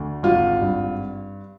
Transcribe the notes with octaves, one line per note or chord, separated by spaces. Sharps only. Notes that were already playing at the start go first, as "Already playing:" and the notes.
Already playing: D2
G#1 F4
G2